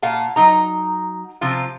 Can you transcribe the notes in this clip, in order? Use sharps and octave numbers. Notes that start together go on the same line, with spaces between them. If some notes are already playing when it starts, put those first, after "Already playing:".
A#2 F5 F#5 A5
F#3 D#4 A#5
C3 F3 F4